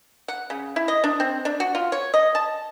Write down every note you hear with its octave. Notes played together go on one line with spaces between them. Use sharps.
F#5
C#3
E4
D#5
D4
C4
D4
F#4
F4
C#5
D#5
A5